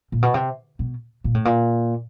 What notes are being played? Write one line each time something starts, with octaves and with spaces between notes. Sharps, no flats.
A#2
B2
C3
B2
A#2
A2
A#2